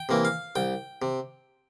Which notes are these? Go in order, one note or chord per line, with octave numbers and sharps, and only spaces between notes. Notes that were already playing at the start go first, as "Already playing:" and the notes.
Already playing: G5
C3 E3 A#3
F5
C2 G5
C3